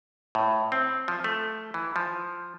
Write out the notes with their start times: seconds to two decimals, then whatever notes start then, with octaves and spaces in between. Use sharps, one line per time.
0.35 A2
0.72 C4
1.08 F3
1.24 A3
1.74 E3
1.96 F3